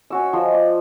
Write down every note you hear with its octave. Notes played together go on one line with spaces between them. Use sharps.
C#4 F#4 E6
F3 C5 D#5
D5